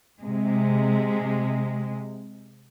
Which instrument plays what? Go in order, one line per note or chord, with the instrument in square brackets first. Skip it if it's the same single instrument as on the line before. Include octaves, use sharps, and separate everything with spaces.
[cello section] C3 G#3